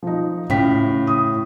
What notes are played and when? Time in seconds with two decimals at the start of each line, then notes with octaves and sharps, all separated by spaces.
0.03 F3 D#4
0.50 A2 C#3 G5 B6
1.07 D#6